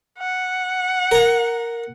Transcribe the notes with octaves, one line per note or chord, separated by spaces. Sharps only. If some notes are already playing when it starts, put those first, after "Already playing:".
F#5
A#4 A#5